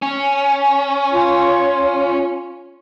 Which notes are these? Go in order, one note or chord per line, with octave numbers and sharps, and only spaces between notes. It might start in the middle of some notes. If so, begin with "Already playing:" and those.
C#4
F4